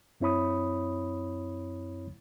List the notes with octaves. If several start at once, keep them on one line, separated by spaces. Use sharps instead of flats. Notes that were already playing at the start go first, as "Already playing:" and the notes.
F#2 C4 E4 C#5 B5 D#6